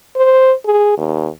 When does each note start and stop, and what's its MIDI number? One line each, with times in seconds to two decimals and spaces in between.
0.16 0.53 72
0.65 0.94 68
0.98 1.29 39